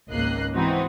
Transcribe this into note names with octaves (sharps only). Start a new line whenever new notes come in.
G#1 C#2 A#3 D#5 F#6 C7
G#2 E3 C4 D#4 F#4